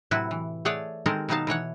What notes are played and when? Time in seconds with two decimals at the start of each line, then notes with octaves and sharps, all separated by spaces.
0.11 A2 C3 F#3 E4 F#4 B4
0.31 E3
0.65 A3 G#4 C#5 D5 F#5
1.06 D#3 G#3 C4 G4 A4 A#4
1.29 B2 D#3 F#3 D#4 F5 A5
1.47 B2 E3 C#5 F#5